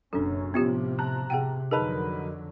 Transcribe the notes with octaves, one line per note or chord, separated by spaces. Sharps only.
F#1 F#2 B2 C#4 D4 A4
A2 C3 F3 B3 F4 G4
A5 A#5 F#6
C3 G#4 F#5 G5
F2 D3 F#3 D#4 G#4 A#4 B4 A5